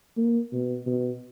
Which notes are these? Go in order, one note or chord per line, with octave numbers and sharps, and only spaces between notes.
A#3
B2
B2